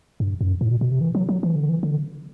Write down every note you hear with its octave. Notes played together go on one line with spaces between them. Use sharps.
G2
F#2
A2
B2
B2
C3
E3
F#3
F#3
E3
D3
E3
D3